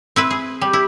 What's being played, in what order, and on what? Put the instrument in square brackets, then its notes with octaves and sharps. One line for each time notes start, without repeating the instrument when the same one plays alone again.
[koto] C4 E4 B4
G#4
[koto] G3 [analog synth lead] G4
[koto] E4